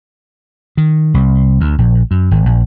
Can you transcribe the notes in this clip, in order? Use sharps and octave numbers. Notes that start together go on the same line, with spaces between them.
D#3
C2
D2
A#1
F#2
G#1
A#1